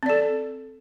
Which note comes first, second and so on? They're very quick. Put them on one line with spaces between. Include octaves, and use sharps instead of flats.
C4 D5 A4